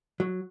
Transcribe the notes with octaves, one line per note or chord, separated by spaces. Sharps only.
F#3